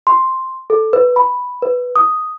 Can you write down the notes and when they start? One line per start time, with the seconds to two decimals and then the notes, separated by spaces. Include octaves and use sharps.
0.07 C6
0.70 A4
0.93 B4
1.16 B5
1.62 B4
1.96 D#6